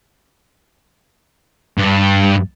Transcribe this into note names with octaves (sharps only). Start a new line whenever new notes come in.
G2